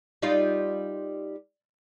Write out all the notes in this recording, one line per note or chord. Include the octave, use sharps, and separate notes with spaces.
G3 D#4 F4